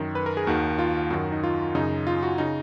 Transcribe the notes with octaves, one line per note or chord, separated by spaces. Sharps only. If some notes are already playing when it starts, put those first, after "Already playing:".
Already playing: F#2 D#3
B4
A#4
G#4
D#2 D#3 F#4
F4
F#2 D#3 F#4
D#4
F4
F#2 C#3 D#4
F4
F#4
C#3 D#4